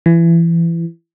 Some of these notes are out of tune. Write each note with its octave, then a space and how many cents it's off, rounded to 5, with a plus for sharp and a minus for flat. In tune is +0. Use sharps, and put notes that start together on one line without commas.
E3 +25